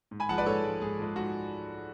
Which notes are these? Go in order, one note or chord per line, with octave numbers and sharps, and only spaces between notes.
G#2
G#5 B5
F3 G#3 F#5 A5
B4 D5
G#2 A4 C#5
F3 G#3
G#2 G#4
F3 G#3
G#2 F#4